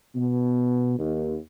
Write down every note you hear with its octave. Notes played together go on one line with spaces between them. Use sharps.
B2
D#2